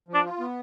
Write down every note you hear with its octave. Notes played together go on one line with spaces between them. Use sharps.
F3
D4
F4
B3